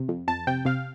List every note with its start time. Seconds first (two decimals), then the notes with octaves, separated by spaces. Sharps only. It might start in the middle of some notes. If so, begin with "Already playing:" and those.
Already playing: C3
0.09 F2
0.28 F2 A5
0.47 C3 G5
0.65 C3 F5